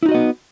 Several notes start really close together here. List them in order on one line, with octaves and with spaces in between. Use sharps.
E4 D#4 F#4 D#5 B3